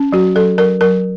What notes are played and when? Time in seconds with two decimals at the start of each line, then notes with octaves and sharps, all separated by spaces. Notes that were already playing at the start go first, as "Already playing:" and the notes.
Already playing: C#4
0.12 F#3 F#4
0.35 F#3 A4
0.58 F#3 A#4
0.81 F#3 A#4